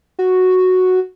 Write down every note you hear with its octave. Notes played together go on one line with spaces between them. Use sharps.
F#4